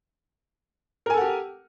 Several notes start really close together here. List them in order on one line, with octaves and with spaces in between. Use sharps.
A#4 G#5 A4 F#5 G4